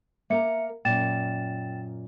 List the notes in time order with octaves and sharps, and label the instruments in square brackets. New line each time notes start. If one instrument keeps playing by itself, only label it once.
[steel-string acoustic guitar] A#3 A#4 A#5 [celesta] E5 C#7
[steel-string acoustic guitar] F#2 A#2 [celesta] G5 A6 E7